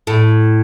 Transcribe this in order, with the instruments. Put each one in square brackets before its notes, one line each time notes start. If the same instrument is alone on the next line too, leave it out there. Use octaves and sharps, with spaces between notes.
[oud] A2